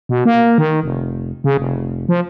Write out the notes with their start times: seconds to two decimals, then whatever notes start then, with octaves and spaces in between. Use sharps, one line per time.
0.09 B2
0.25 A#3
0.58 D#3
0.83 F1
1.44 C#3
1.57 F1
2.09 F3